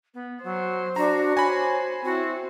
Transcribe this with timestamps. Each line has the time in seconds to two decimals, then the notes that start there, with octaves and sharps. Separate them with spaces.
0.14 B3
0.43 F#3 C5
0.96 D4 F#4 A#5
1.37 C5 C#5 G#5 B5
2.05 C4 E4 F#4